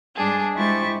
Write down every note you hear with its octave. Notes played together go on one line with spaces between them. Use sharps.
G#2 G3 D4 G#4 A5
G#3 E4 G4 C5 C#6 A6